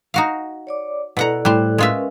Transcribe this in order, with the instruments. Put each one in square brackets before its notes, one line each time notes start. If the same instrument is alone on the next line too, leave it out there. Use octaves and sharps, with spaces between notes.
[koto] D#4 F#4 F5
[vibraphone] C#5 D5 D6
[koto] B2 F#5 A#5 [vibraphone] E4 A4 D5
[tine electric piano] A2 F#6 [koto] G3 C5
[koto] G#3 F4 E5 [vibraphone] C#4 A#4 B4